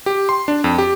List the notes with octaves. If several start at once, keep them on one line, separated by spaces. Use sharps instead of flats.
G4
C6
D4
F2
G4